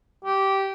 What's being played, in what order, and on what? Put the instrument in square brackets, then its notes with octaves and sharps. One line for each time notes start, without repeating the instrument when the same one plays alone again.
[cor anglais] G4